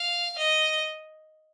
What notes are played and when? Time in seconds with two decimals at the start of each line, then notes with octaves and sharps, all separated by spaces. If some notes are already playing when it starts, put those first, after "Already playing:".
Already playing: F5
0.38 D#5